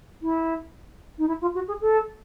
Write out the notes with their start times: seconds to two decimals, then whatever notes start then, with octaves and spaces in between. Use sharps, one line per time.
0.22 E4
1.18 D#4
1.28 E4
1.41 F4
1.54 F#4
1.68 G#4
1.81 A4